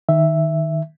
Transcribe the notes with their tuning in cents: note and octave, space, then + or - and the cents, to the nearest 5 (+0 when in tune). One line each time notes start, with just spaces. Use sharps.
D#3 +0 E5 +0